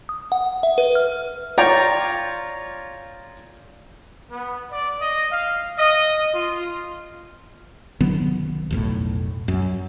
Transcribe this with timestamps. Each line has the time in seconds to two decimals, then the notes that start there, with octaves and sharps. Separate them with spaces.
0.09 D#6
0.32 F#5
0.63 E5
0.78 B4
0.95 F6
1.58 F4 C#5 D5 G5 A#5
4.30 B3
4.72 D5
5.00 D#5
5.32 F5
5.77 D#5
6.34 F4
8.01 C2 D#3 F#3 B3
8.71 F1 B1 A2
9.48 F#2